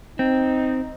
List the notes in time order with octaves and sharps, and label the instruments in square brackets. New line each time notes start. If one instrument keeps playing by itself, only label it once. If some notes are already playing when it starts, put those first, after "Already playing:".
[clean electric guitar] C4 [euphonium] D#4